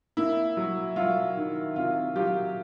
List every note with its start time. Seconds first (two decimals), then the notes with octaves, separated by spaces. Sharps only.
0.17 A#3 E4
0.57 F#3
0.96 F#3 F4
1.37 D#3
1.76 C3 F4
2.16 F#3 F4 G4